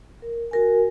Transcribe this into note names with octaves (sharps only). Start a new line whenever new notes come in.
A#4
F#4 A#4 G#5